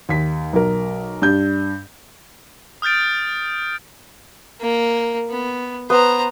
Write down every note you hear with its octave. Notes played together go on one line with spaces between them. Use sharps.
D#2 B6
B1 A#4
G2 G6
D#6 F6 G6 A6 D7
A#3
B3
B3 C5 A#5